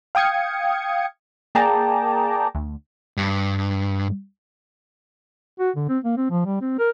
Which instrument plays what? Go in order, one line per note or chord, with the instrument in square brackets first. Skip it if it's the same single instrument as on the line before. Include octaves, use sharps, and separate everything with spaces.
[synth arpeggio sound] F5 G5 D#6 G#6 C#7
A#3 G#4 D5 G5 A5 A#5
D2
[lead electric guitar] G2
[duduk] F#4
D3
C4
A#3
C4
F3
G3
C4
A#4